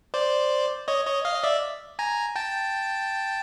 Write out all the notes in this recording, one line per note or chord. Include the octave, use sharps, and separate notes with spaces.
C5 D5
C#5 D#5
C#5 D#5
D#5 F5
D#5
D5 E5
G#5 A#5
G5 A5